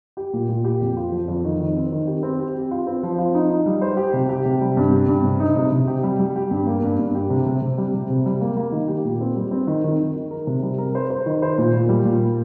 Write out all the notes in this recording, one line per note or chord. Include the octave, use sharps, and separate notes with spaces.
G4
A#2
A#2
G4
F2
F4
F3
F2
D#3
D#3
C4
D#3
G4
C4
G4
G4
F4
C4
F3
F4
D#4
D#4
G3
C5
G4
C3
G4
C3
G3
G2
G4
G2
C3
D#4
C3
C3
G4
G3
G3
G4
G2
A#3
G2
G2
G4
C3
C3
C3
G3
C3
C3
G3
A#3
A#3
D#3
G4
A#2
C4
G3
C4
D#3
D#3
D#3
D#3
A#4
C3
G3
A#4
C5
C5
D#3
C5
A#2
A#2
G3
A#2